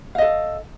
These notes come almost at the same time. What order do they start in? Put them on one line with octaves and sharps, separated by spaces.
F5 D#5 A4